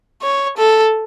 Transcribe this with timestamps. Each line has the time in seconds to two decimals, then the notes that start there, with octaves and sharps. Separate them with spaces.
0.22 C#5
0.57 A4